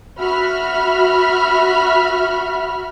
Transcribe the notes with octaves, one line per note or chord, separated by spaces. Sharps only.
F#4 E5 B5 F6